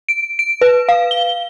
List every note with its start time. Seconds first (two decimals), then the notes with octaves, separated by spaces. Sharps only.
0.09 D7
0.39 D7
0.61 B4
0.89 F5
1.11 G7